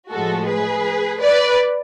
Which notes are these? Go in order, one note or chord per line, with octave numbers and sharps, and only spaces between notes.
A2 F3 G#3 F#4 A4
G#4 B4
B4 D5